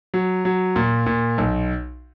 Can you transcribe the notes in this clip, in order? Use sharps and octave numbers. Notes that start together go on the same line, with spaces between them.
F#3
F#3
A#2
A#2
B1